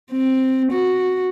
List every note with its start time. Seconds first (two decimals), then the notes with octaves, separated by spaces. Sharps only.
0.12 C4
0.72 F#4